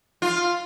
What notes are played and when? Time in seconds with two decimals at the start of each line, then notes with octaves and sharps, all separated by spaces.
0.22 F4